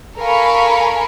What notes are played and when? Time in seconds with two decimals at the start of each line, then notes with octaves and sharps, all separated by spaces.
0.17 A4 A#4 F5 G#5 B5 C#6